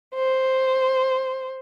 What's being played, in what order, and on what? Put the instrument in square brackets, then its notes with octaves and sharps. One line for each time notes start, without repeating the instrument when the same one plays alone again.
[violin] C5